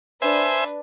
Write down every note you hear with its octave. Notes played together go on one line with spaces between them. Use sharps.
D4 B4 C5 E5 G#5